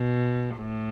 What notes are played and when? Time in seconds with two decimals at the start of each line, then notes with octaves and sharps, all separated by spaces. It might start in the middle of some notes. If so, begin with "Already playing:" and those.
Already playing: B2
0.56 A2